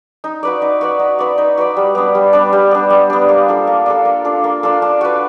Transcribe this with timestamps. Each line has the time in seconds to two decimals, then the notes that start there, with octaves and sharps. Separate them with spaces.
0.24 D#4
0.43 F#4 B4 D5
0.62 D#4
0.81 F#4 B4 D5
0.99 D#4
1.19 F#4 B4 D5
1.38 D#4
1.57 F#4 B4 D5
1.77 G3
1.95 B3 D4
2.15 G3
2.33 B3 D4
2.53 G3
2.71 B3 D4
2.90 G3
3.10 B3 D4
3.29 A#3
3.48 D4 F4 A4
3.67 A#3
3.86 D4 F4 A4
4.05 A#3
4.25 D4 F4 A4
4.44 A#3
4.63 D4 F4 A4
4.82 D4
5.01 F#4 B4